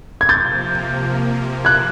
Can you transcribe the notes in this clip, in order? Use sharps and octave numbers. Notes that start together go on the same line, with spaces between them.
G#6
C3 F3 A#3 G6 A6
F#6 G#6